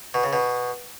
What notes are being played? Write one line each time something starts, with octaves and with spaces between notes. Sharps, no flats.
B2
C#3
B2